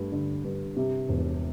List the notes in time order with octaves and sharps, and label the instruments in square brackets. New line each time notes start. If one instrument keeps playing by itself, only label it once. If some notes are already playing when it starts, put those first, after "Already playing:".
Already playing: [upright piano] G2 A3
D3
G2
C3
E1